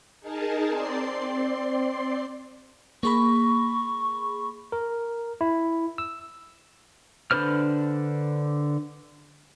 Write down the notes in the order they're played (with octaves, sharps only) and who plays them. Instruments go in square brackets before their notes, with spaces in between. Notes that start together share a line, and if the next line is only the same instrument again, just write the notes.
[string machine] D#4 G#4 A#4 A5
C4 D5 C6 C7
[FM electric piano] A#3 G#4 B5 [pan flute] C#6
[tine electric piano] A#4
E4
E6
[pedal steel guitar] D3 D4 B4 C5 F6